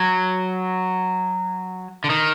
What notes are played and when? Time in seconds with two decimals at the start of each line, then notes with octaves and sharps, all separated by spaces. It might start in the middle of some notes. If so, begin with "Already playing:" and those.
Already playing: F#3
2.04 D3
2.10 D#3